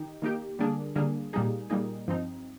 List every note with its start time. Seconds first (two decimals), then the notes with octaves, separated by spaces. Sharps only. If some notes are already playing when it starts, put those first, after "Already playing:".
Already playing: D#3 D#4 G4
0.22 D#3 A#3 D#4 G4
0.59 D3 G3 A#3 D4 G#4
0.95 D3 G3 A#3 D4 G#4
1.33 A#2 G3 A#3 D#4 G#4
1.70 A#2 G3 A#3 D#4 G#4
2.08 G2 F3 C4 D#4